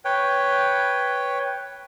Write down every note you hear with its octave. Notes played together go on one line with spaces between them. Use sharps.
B4 C#5 G5